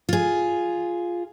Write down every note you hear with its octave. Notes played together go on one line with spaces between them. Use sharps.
F4 G#4